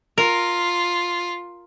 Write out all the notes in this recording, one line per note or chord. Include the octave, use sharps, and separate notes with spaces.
F4 A#4